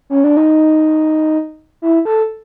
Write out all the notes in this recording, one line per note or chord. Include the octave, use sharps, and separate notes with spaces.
C#4
D4
D#4
E4
A4